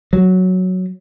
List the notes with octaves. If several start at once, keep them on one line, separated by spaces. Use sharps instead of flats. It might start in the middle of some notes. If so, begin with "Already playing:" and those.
F#3